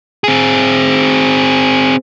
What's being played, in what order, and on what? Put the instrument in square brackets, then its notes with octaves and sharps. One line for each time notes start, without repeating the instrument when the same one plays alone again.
[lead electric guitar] C4 G#4